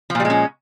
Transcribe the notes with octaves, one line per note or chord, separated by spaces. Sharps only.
A#2 F3 G3 G#3 C#4